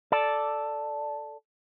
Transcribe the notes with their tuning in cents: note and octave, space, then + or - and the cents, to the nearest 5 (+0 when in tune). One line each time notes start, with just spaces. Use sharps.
A4 +0 D5 +0